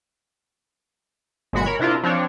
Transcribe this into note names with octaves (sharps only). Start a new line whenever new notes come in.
G1 A#2 G#3 F#4 B5 C#7
A#4 C#5 B5
C3 D4 E4 F4 A#4
F3 C4 D4 C#5